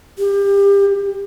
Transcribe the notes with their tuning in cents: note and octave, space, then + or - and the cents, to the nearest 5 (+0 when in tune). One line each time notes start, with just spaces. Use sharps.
G4 +30